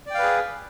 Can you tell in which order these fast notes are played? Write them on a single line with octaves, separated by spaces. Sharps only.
D5 G5 F5 B4 G#4